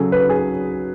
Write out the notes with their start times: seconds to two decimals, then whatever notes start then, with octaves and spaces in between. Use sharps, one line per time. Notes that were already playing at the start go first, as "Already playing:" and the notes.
Already playing: C#3 F#3 G#4 A4
0.12 B4
0.30 G#4